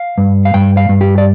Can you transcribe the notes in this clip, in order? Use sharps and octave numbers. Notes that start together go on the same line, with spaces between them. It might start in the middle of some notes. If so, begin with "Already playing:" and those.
Already playing: F5
G2
F5
G2 G5
F5
G2
G4
D5